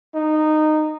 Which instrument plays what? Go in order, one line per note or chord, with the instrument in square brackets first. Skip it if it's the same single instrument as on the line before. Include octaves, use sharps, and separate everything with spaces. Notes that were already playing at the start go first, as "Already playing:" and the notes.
[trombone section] D#4